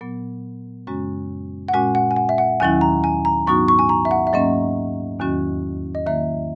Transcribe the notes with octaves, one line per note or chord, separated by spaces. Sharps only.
A#2 F#3 B3
F#2 C#3 G#3 C#4 F#4
F#5
A#2 G#3 C#4 F#4 G#5
F#5
G#5
F#5
E5
F#5
D#2 D#3 F#3 C#4 E4 G#5
A#5
G#5
A#5
G#2 F#3 B3 D#4 F#4 C#6
C#6
G#5
A#5
E5
F#5
E5
G#2 F#3 A#3 C#4 D#5
E2 D#3 F#3 C#4 F#4
D#5
D#3 F#3 A#3 E4 E5